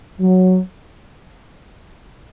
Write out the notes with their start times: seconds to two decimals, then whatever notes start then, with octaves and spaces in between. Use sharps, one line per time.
0.20 F#3